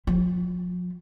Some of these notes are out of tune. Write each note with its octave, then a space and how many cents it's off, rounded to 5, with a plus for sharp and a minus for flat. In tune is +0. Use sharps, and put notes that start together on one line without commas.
F3 +40 F4 +0